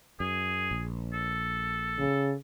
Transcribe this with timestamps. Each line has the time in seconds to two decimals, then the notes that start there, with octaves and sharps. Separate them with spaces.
0.20 F#2 G#4
0.71 A#1
1.13 A4
1.99 C#3